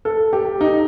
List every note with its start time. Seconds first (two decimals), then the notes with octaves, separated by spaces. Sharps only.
0.05 A4
0.33 G4
0.61 D#4